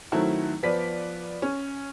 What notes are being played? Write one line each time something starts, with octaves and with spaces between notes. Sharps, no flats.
D#3 F#3 A3 C4 E4
F3 B3 B4 D5 B6
C#4